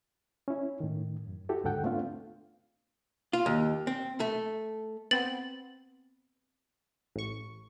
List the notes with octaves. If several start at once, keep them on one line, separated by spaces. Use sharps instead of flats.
C#4 E4
A2 D#3
F#2
E4 F#4 G4 A4
D#2 G#2 D3 A4 F#5 G5
A3 B3 C4 D4 F4 F5
F4
D#2
C4
A3
B3 C4 A6 F#7
A1 C#6